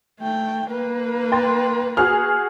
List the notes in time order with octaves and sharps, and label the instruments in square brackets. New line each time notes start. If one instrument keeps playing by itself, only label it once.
[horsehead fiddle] A3 G5
A#3 B4
[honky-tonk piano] G5 C6 A6
F#4 G#4 F6